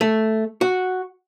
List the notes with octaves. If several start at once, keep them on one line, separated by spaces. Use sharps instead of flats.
A3
F#4